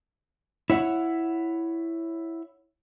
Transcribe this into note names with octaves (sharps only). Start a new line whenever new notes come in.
E4 C#5 F#5